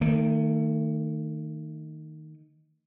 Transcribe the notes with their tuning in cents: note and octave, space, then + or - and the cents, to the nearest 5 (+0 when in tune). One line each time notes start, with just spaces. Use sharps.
D#3 +0 A3 +40